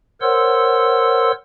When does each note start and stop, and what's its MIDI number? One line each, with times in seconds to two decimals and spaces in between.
0.21 1.31 70
0.21 1.31 72
0.21 1.31 73
0.21 1.31 78
0.21 1.31 84
0.21 1.31 88